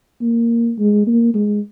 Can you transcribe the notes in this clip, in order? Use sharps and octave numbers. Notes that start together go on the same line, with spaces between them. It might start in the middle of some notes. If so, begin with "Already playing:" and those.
A#3
G#3
A#3
G#3